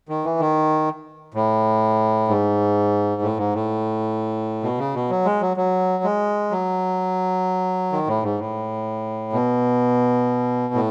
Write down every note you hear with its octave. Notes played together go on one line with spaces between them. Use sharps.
D#3
E3
D#3
A2
G#2
A2
G#2
A2
B2
C#3
B2
F#3
G#3
F#3
F#3
G#3
F#3
D#3
A2
G#2
A2
B2
A2